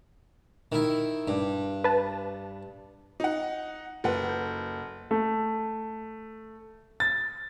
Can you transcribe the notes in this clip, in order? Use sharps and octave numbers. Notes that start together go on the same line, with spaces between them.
D#3 E4
G2
B4 A5
D#4 F#5
F#1 A4 B4 F#5
A4 G6
A3
A6